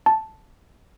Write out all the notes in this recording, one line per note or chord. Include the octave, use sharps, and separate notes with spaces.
A5